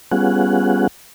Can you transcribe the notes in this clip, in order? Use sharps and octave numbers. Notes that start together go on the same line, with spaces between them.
G3 B3 C#4 F4 G#4 F#5